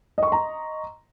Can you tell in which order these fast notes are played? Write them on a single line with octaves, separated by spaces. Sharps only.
D#5 C#6 C6 A#5